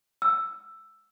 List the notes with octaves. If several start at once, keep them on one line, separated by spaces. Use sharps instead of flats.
E6